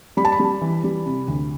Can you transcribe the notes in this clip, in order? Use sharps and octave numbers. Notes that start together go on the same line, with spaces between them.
G3 B5
A5
B5
G3
E3
G3
C3
D2